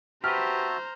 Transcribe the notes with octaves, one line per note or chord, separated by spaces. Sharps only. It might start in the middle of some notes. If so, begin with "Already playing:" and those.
F#4 G4 B4 C5 E5 A5 A#5 F6